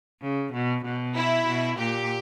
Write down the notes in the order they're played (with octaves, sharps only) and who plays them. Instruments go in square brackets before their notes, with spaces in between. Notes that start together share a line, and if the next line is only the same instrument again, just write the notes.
[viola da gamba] C#3
B2
B2
[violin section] E4
[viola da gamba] B2
[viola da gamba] A#2 [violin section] G4